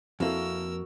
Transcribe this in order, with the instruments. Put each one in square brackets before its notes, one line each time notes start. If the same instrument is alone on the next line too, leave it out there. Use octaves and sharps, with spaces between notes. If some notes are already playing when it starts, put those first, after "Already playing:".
[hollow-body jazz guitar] F2 A#3 [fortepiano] C4 E4 A4 [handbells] F#4 [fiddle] A#4 E6